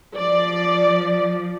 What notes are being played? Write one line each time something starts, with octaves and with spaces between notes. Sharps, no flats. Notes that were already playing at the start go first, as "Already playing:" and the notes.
F3 D5